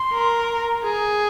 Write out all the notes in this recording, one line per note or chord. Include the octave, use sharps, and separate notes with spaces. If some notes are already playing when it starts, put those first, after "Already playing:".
Already playing: C6
A#4
G#4